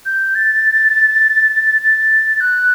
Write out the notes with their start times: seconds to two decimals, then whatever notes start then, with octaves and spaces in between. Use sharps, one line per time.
0.06 G6
0.35 A6
1.82 A6
2.40 F#6